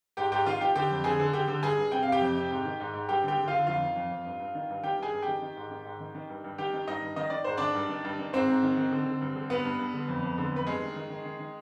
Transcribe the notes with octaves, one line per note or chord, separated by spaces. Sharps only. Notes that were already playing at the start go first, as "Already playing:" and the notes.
G#2 G4 G5
G#2 G4 G5
D#3 F4 F5
D#3 G4 G5
D3 G4 G5
F2
D3 G#4 G#5
D3
D3 G4 G5
D3
G2 G#4 G#5
G2
C3 G5
C3 F5
G4 G5
F2
C3
G#2
D#3
G#2
G#2
G2 G4 G5
D3 G4 G5
D3
F4 F5
D3
F2 F4 F5
D#3
F2
F2
G2
G2
D#3
G2
D#3 G4 G5
G2 G#4 G#5
G2
D#3 G4 G5
D#3
G#2
D#3
G#2
D#3
D#3
G2
G2
D#3 G4 G5
D#3
G2 D#4 D#5
G2
D#3 D#5
D#3 D5
G#2 C5
D#3 D4 D5
G2
D#3
G2
D#3
G#2 C4 C5
G#2
D#3
D#3
D3
D3
G2
D3
G2 B3 B4
G2
G2
D3
F2
F2
D3
F2 B4
G2 G#3 G#4
D#3
D#3
D#3
D#3
D#3